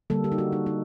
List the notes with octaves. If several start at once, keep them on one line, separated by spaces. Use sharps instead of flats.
D3 G3 A#3 A4
G4
D#4
F#4
D#4
D#4